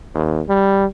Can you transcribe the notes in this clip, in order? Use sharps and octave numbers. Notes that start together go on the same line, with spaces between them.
D#2
G3